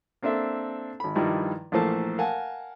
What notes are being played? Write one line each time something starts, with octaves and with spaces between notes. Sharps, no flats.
A#3 C4 D4 A4 E5
G#1 B5
G2 D#3 F3 G3 D#4 E4
A#1 E3 A3 A#3 C5 A5
A#4 F5 F#5 G#5 A5